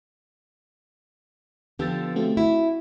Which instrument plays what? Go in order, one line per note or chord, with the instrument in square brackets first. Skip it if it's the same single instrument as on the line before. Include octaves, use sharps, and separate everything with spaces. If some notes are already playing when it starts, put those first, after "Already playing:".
[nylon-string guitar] D3 F3 G4 [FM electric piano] B3 E6 A6
[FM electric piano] A3 C4 F#4
[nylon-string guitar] E4 [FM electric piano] F#4